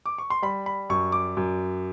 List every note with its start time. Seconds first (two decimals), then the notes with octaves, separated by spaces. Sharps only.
0.06 D6
0.18 C#6
0.30 C6
0.42 G3 B5
0.66 B5
0.90 F#2 C#6
1.12 D6
1.37 F#2